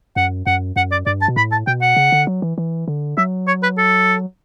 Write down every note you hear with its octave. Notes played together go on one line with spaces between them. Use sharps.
F#2 F#5
F#2 F#5
F#2 F#5
D5
G2 D5
A5
B2
A2 B5
A5
B2 G5
F#5
C#3
D3
F#3
E3
E3
D3
F#3 E5
C#5
B4
A4